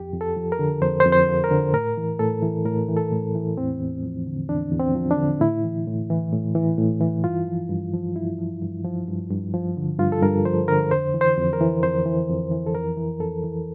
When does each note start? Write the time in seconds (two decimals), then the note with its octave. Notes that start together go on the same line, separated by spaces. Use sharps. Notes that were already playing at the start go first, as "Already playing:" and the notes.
Already playing: F2 G4
0.13 F2
0.21 A4
0.37 F3
0.52 A#4
0.59 D3
0.82 F2 C5
1.00 C5
1.06 F2
1.12 C5
1.29 F3
1.44 A#4
1.51 D3
1.73 A2 A#4
1.97 E3
2.19 A2 A4
2.42 E3
2.65 A2 A#4
2.88 E3
2.97 A4
3.12 A2
3.35 E3
3.57 E2 C4
3.80 E2
4.03 F3
4.27 D3
4.49 E2 D4
4.72 E2
4.80 C4
4.95 F3
5.11 D4
5.17 D3
5.40 A2 E4
5.64 E3
5.87 A2
6.10 E3
6.33 A2
6.55 E3
6.78 A2
7.01 E3
7.24 G2 F4
7.48 F3
7.69 G2
7.93 F3
8.16 G2 E4
8.39 F3
8.61 G2
8.84 F3
9.08 G2
9.30 G2
9.53 F3
9.77 D3
9.99 G2 F4
10.12 A4
10.22 G2 A#4
10.45 F3 C5
10.68 D3 A#4
10.91 F2 C5
11.14 E3
11.21 C5
11.37 F2
11.53 A#4
11.61 E3
11.83 F2 C5
12.06 E3
12.29 F2
12.51 E3
12.67 A4
12.75 F2 A#4
12.97 E3
13.20 F2 A4
13.44 E3